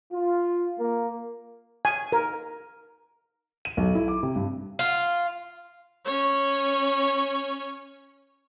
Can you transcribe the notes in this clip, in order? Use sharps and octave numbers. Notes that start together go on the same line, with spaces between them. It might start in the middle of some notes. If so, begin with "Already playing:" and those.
F4
A#3
G#5
A#4
D#7
B1
E4
D6
C3
G2
F4
C#4 C#5